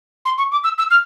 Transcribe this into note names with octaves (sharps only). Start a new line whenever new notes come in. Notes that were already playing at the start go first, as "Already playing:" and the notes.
C6
C#6
D6
E6
E6
F6